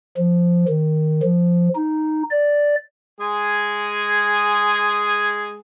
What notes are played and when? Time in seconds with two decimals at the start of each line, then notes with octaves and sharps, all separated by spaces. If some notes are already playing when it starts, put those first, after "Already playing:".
0.17 F3
0.69 D#3
1.23 F3
1.75 D#4
2.31 D5
3.20 G#3 G#4 G#5